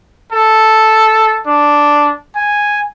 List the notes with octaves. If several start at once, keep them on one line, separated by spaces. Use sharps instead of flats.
A4
D4
G#5